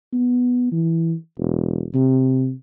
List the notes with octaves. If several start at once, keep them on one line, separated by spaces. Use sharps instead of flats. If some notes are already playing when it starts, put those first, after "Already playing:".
B3
E3
E1
C3